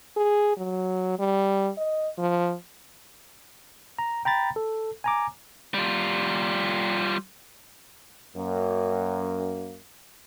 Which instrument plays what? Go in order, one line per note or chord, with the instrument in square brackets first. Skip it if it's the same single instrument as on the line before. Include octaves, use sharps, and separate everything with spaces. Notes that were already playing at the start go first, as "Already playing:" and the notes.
[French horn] G#4
F#3
G3
D#5
F3
[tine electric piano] A#5
G5 A#5 B5 A6
A4
G#5 A#5 D6
[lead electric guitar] G3 F4
[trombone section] F#2 A#3